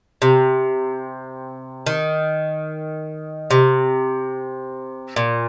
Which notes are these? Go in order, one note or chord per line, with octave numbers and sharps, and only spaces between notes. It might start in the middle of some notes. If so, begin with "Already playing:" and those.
C3
D#3
C3
A#2